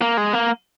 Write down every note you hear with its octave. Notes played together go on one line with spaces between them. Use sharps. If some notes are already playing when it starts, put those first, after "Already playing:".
A#3
G#3
A#3